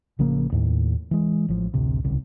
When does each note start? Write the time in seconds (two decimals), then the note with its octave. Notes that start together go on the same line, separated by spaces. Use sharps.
0.19 A1 C#3 F3 A#3
0.52 D#2 A2
1.11 E3 G#3
1.48 A1 F3
1.74 A1 D2 C3
2.04 D1 C2 C#3